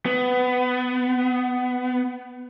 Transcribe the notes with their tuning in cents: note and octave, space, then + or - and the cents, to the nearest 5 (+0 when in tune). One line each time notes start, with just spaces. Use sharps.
B3 +20